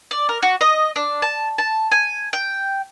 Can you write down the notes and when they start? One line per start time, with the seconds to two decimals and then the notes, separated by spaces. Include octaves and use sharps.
0.11 D5
0.29 A#4
0.43 F#4
0.61 D#5
0.96 D4
1.22 A5
1.58 A5
1.91 G#5
2.33 G5